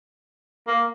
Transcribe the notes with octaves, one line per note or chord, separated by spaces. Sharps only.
A#3